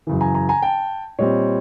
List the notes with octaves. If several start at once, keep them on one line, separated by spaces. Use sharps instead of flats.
F#2 C#3 E3
G#5 A#5
G#5 A#5
G#5 A#5
G5 A5
A#2 G3 C4 C#5 D#5